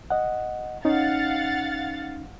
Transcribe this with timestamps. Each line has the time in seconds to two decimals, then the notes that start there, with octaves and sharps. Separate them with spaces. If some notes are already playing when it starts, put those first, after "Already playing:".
0.10 D#5 F#5
0.85 C#4 D#4 F5 F#5 A6